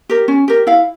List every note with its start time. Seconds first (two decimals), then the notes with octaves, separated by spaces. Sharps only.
0.09 G4 A#4
0.28 C#4
0.48 G4 A#4
0.67 E4 F5